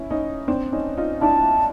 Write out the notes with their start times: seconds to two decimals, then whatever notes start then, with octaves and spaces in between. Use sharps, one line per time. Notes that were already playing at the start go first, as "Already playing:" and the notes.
Already playing: C#4 E4
0.10 C#4 D#4
0.48 C4 D4
0.73 C#4 D#4
0.97 D#4 F4
1.21 D4 E4 A5